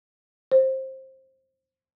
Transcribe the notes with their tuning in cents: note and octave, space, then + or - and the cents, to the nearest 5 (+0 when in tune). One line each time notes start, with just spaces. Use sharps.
C5 +20